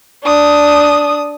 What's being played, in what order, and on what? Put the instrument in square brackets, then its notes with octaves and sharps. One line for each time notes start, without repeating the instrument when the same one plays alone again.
[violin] D4 D#6